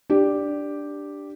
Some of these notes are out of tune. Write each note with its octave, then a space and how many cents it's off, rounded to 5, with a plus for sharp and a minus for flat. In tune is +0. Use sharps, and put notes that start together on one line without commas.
D4 +0 G4 +0